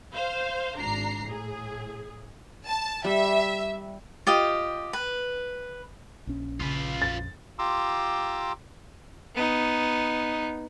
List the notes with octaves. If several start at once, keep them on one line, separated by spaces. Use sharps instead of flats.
C5 F5
G#1 D4 A#5 C7
A2 G#4
A5
G3 E5
F4 G4 D#5
B4
A#1 C#4
C#3 F4 B4
F2 A6
F4 G4 A#5 C6 D6 E6
B3 D#4